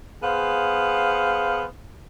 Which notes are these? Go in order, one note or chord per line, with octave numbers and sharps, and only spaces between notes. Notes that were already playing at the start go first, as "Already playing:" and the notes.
B3 G#4 C5 F5